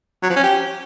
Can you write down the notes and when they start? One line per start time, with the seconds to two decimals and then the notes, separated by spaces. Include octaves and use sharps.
0.23 F#3
0.30 F3
0.36 C#4
0.43 G4